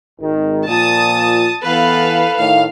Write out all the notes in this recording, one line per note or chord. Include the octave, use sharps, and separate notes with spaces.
G#1 D#3
A#2 F3 A5 D#6
E3 B3 A4 B4 F5
A2 D#3 F5